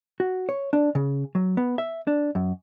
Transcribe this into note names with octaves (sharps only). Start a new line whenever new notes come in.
F#4
C#5
D4
C#3
F#3
B3
E5
D4
F#2